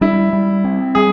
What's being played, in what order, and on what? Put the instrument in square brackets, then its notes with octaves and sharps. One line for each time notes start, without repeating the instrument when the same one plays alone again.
[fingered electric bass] G3 [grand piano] E4
[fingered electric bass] G3
C4
[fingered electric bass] G3 [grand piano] G#4